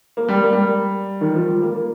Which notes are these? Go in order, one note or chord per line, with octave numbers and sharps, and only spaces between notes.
A#3
G3
A#3
G3
D#3
F3
G3
A#3
A#3